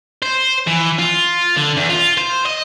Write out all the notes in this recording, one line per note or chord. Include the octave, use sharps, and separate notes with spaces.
C5
E3
F4
D3
E2
F4
C5
D#5